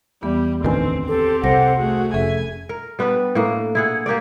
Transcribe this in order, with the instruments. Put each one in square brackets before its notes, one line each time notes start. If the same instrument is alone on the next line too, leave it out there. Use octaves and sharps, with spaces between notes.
[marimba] E2 E3 B3 [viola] G3
[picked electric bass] A1 D2 D#3 [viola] C4 [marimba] B4 G#5
[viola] C4 G4 [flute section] A4
[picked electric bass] C2 [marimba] G3 A#6 [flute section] A4 C5 F#5
[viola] A3 F#4 [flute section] G#4
[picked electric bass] F1 [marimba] C#4 G#4 A4 [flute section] E5 [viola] G#5
[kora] A#4
G3 B3 D4 B4
A2 A#3
E4 G#4 F#5
A#3 G4 A#4 D5